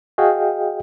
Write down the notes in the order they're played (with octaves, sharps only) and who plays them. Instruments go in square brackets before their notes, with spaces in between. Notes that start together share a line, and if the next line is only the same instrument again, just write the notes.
[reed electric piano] F#4 G#4 D#5 F5 G5